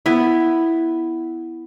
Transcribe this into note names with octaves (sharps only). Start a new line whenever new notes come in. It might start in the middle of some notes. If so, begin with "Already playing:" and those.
B3 E4